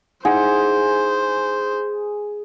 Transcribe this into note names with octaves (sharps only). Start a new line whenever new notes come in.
D#4 E4 G#4 C5 F#5